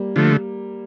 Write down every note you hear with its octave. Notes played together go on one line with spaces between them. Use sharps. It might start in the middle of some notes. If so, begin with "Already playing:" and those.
Already playing: G3 A#3
D3 F3 A3